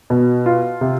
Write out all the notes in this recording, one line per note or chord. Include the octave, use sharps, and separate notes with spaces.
B2
F4
C3